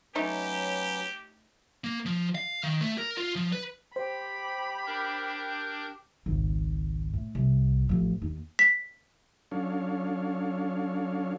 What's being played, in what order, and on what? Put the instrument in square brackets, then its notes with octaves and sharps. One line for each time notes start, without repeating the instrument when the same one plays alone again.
[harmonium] F#3 C#4 B4 [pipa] A3 D#4 C#5 [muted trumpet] G4
[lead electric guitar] A#3
F3
F5
D#3
A3
A#4
F4
F3
B4
[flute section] G4 G5 [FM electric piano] C5 [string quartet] B5
[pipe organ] D4 A#4 G6
[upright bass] G#1 C#2
A2
C2
A1 F3
D#2 D#4
[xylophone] B6
[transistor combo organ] F#3 C#4 D4 A4 C#5 F5